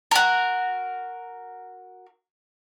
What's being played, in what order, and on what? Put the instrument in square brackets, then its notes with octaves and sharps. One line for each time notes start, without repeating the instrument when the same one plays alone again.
[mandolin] F#4 A#4